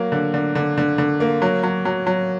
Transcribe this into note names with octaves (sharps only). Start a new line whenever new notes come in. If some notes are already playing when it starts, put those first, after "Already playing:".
Already playing: F#3 A#3
D3
D3
D3
D3
D3
A#3
F#3
F#3
F#3
F#3